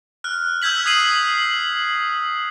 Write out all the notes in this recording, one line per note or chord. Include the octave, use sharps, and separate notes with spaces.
F6 F#6
E6 G6 G#6 B6 F#7
D#6 G#6 B6 C7 D#7 F#7